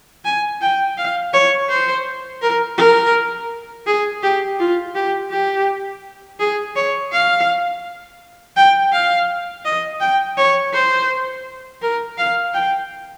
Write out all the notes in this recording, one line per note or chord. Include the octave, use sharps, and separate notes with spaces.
G#5
G5
F5
C#5
C5
A#4
A#4
G#4
G4
F4
G4
G4
G#4
C#5
F5
G5
F5
D#5
G5
C#5
C5
A#4
F5
G5